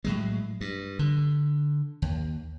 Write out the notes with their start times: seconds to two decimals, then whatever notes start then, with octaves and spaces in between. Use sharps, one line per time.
0.04 A2 F#3 G#3
0.61 G2
0.99 D3
2.02 D#2